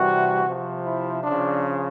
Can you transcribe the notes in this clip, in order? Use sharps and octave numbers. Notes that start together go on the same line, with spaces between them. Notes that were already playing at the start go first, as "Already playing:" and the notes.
Already playing: C3 E3 G3 F#4
C3 F3
E4
C#3 F3 D4